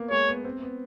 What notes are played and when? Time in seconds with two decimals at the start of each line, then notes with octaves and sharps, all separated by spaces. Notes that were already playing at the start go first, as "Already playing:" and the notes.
Already playing: A#3 B3
0.10 G#3 C#5
0.28 B3
0.44 C4
0.62 B3